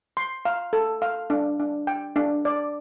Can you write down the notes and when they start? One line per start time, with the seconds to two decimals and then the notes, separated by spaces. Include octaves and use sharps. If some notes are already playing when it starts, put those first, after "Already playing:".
0.17 C6
0.45 F5
0.73 A4
1.02 F5
1.30 D4
1.59 D4
1.87 G5
2.16 D4
2.45 D5